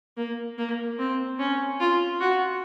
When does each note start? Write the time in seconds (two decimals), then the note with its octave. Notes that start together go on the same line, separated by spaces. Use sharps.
0.17 A#3
0.58 A#3
0.99 C4
1.39 C#4
1.80 F4
2.20 F#4